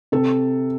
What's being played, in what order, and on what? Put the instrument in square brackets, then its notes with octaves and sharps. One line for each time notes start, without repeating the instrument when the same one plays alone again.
[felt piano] C3 A4